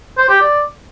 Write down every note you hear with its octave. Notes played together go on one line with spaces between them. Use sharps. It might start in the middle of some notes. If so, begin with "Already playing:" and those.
C5
G4
D5